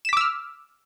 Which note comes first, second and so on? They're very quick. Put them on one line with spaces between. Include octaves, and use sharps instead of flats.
E7 B6 D6 E6 F6